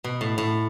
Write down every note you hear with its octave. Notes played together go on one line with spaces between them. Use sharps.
B2
A2
A2